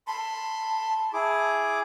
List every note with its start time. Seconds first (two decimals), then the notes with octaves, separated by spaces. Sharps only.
0.07 A5 B5 C6
1.13 E4 G#4 D6